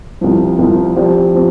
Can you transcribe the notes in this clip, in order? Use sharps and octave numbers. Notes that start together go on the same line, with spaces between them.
C2 C3 F3
C2 C3 F3
C3 F3 C4 G4 D5
C3 F3 C4